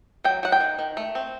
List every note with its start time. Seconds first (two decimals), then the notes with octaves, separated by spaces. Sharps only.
0.24 F#3 G5
0.43 F#3 F#5
0.52 G5
0.60 D#3
0.79 D#3
0.97 A3
1.15 C4